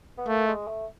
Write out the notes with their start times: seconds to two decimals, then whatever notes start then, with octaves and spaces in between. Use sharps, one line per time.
0.18 B3
0.27 A3 A#3
0.47 G#3
0.67 A3